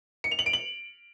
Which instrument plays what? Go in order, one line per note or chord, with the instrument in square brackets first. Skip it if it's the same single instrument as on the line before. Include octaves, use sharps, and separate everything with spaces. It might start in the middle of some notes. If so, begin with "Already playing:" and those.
[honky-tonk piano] C#7
F7
F#7
D7
F#7